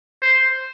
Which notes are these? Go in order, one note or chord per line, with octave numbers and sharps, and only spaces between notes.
C5